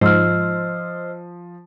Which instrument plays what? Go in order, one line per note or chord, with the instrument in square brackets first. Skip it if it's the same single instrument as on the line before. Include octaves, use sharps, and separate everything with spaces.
[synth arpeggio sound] G#2 [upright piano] F3 [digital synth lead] C5 [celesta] D#5 E6 F6